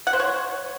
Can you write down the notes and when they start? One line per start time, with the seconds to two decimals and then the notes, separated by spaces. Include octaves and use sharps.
0.07 F#5
0.13 C5
0.20 C#5